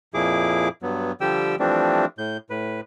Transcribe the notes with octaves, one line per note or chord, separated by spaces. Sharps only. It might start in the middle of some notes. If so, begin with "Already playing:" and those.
F2 A#2 F3 E4 G#4 D6
G2 F#3 B3
D3 F3 G3 G4 G5 E6
E3 F3 G3 A3 C4 D4
A2 G6
A2 B4